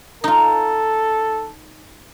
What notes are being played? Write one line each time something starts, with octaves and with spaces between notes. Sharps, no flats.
D#4 F4 A4